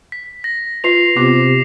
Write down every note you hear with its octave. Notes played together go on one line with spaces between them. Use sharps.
B6
A#6
F4 B4 C7 F7
C3 B3 F4 D6